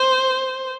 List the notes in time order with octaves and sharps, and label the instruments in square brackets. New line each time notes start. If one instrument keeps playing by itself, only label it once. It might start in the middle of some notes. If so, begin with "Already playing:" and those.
Already playing: [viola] C5